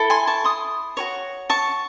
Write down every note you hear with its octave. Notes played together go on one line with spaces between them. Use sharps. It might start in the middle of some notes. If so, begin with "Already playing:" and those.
Already playing: E4 A4
G#5 C6
A5 C#6
C6 D#6
F#4 A4 C#5
A5 C#6